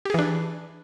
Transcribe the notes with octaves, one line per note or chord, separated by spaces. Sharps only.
E3 D4 G4 G#4